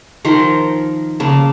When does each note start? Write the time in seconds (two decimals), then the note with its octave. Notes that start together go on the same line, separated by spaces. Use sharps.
0.25 D#3 F3 A#4 C5
1.20 C#3 A#3 A5